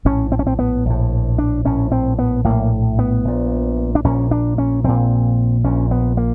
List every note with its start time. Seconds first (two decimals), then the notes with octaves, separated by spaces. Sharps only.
0.05 A#1 A2 C#4
0.32 C4
0.39 C#4
0.47 C4
0.59 B3
0.85 A#1 A2
1.38 D4
1.65 A#1 A2 C#4
1.92 C4
2.19 B3
2.44 A#1 A2 A#3
2.99 B3
3.25 A#1 A#2
3.95 D4
4.04 A#1 A#2 C#4
4.31 D4
4.58 C#4
4.84 A#1 A#2 C4
5.64 A#1 A#2 C#4
5.91 B3
6.17 A#3